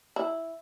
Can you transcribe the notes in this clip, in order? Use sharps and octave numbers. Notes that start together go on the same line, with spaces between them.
E4